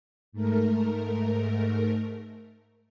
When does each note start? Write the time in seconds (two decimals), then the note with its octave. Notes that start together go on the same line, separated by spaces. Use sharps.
0.32 G#2 A3 A#4